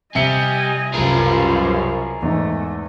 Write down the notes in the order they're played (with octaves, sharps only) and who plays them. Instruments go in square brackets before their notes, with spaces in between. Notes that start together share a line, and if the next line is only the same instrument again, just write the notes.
[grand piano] C3 E5 C#7 [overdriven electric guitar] G3 [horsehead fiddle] D#5 G#5
[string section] C2 F#2 B2 [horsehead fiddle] F4 [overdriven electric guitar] G#4 A#4
[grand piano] E2 G#2 [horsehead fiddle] A3